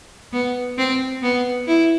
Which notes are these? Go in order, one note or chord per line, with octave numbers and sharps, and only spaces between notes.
B3
C4
B3
E4